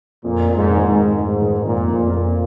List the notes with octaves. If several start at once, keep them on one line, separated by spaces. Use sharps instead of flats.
F2 A#2
F2
G#2
D#3
G#2
G#3
G#2 G#3
D#3
F2 A#2
F2
F2 A#2